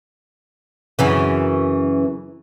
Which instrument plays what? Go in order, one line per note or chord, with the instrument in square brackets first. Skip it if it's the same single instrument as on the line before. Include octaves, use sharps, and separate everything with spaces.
[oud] F#2 C#3 E3